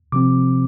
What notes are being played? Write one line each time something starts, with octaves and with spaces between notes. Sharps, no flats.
C3 F3 C4 D6